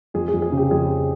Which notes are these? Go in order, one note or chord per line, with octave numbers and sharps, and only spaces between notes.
F2 G#4
G#4
F2
G#4
C#3
G4
F2 G#4